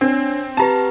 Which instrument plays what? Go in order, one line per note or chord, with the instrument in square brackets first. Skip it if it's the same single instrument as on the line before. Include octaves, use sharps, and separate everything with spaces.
[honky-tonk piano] C4 [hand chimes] D4 C#5
[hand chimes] C4 G4 B4 [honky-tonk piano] A5 A#5